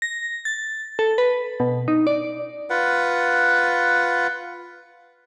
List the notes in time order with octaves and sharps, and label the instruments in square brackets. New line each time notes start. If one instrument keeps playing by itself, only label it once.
[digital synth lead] A#6
A6
A4
B4
B2
D#4
D5
[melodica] F4 B4 F#5